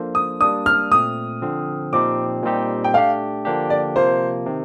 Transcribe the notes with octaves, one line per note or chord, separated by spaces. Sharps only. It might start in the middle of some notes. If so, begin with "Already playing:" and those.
Already playing: F3 A#3 D4 A4 C5
D#6
G3 A#3 D4 D#6
F6
A#2 A3 C4 D#6
D3 F3 C4
A#2 F3 C4 D#4 G4 D6
A#2 G3 C4 D#4 G4
G5
A3 D4 G4 F5
D3 F3 A#3 D4 G4
D5
C3 F3 A#3 C5
C3 D#3